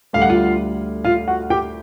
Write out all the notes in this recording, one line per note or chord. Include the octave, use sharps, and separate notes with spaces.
D2 D3 G3 F5
F#5
F4 F5
F4 F5
F#4 F#5
G4 G5